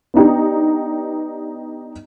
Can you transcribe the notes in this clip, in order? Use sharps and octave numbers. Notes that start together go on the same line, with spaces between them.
B3 D4 D#4 G4